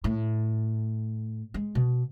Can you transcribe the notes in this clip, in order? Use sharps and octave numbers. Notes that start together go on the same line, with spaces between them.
A2
G#3
B2